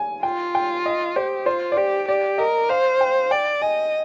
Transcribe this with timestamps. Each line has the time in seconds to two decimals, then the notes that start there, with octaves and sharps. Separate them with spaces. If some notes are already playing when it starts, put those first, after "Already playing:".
Already playing: G#5
0.23 F4 G5
0.55 G5
0.86 D#5
1.16 G4 C5
1.46 F4 C5
1.72 D5
1.77 G4 C5
2.08 G4 D5
2.38 A#4 D#5
2.69 C5 F5
3.01 G5
3.31 D5 G5
3.62 D#5 G#5